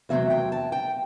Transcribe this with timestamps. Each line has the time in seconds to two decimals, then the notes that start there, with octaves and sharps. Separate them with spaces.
0.09 E2 C3 F#3 A3 C4 E5
0.30 G5
0.52 A5
0.72 G5